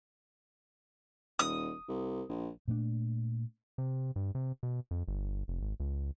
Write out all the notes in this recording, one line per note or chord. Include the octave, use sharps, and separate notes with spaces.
D#1 D#6
C2
A#1
A#2 A3 A#3 D4
C3
G2
C3
B2
F2
G1
F1
G#1
C#2